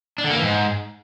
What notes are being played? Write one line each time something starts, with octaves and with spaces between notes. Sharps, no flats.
D4
D3
A#3
E3
G#2